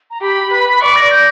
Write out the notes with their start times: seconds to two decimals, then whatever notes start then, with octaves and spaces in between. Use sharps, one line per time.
0.11 A#5
0.21 G4 B5
0.51 B4
0.80 D5 C#6
0.96 A#6
1.11 G6